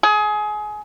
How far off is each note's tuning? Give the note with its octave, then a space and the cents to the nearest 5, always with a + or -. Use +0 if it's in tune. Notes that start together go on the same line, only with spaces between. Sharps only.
G#4 +25